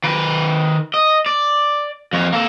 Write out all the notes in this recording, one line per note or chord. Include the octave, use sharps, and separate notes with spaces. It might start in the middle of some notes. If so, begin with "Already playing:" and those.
D#3 B4
D#5
D5
F2 C#5
A#3 A4